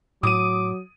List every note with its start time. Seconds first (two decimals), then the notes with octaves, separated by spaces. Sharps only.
0.23 A2 F#3 D6 D#6 D#7